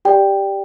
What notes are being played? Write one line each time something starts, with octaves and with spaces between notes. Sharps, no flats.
G4 D5 G5